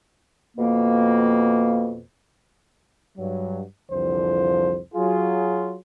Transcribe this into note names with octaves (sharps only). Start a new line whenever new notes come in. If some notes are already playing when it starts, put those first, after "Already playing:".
F2 B2 A#3
G2 F#3
C2 F2 D3 E3 F3 C5
F#3 F4 G#4